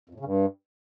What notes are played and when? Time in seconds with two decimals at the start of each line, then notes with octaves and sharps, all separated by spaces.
0.09 F2
0.15 A2
0.20 C#3
0.25 G2